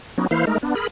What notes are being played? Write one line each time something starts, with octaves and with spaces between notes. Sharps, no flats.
F#3 B3 C#4 D#4
E3 A#3 E4 C5 F5
G#3 A3 D#4 A#4
B3 D4
G#4 A#4 B5